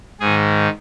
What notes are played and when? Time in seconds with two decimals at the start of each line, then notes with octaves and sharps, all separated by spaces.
0.20 G#2 D#3 G#4